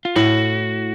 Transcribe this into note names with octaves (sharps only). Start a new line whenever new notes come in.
F4
A2 F#4